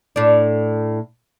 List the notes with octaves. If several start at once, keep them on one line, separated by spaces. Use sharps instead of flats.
A2 D4